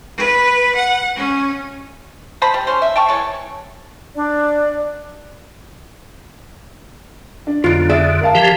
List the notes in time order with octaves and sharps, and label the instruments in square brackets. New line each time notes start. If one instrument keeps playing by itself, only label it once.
[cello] B4
F#5
C#4
[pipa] C5 D#5 A5 B5
G3
C#4 C5
E5
G5 A5 C#6
E3 G#3 A4 C#5
[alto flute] D4 [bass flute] D5
[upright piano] D4
[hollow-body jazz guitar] B1 F4 [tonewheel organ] F2 D3
[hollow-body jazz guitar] G#4 D5 E5
[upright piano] A#4 F5 A5
[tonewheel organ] E3 F3 G4